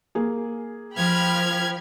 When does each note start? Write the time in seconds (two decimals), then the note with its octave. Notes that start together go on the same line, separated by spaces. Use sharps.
0.15 A#3 G#4
0.97 F3 G5 B5 F6 G#6